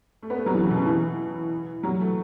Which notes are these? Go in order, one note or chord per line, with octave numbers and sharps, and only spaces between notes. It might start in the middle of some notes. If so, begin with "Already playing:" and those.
A3
B3
A3
F#3
E3
C#3
B2
C#3
E3
F#3
A3